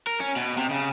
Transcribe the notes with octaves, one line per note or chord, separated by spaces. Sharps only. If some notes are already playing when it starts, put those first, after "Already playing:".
A#4
C#4
B2
C3
C#3